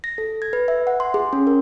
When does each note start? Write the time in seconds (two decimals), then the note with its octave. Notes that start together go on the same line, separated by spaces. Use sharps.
0.04 A#6
0.18 A4
0.42 G#6
0.53 B4
0.68 E5
0.87 F#5
1.00 C6
1.14 G#4
1.33 C#4
1.47 A#4